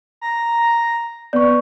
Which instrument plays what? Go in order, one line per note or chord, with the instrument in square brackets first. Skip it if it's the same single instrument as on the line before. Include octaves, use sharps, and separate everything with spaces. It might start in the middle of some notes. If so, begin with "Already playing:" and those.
[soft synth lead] A#5
[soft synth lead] B3 [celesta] D5 C#6